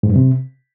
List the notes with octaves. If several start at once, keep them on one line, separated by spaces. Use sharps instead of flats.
G#2
G2
C3